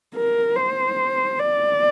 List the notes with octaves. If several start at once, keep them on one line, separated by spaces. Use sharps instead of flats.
A#4
C5
D5